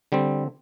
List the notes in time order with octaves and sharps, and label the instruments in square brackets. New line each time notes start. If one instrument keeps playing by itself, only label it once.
[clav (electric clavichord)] D3 G3 C4